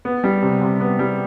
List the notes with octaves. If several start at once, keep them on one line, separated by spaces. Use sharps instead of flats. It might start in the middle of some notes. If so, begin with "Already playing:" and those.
B3
G3
C3
C3
B3
G3